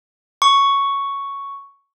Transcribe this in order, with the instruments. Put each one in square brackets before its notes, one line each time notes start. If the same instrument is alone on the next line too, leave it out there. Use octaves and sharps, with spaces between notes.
[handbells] C#6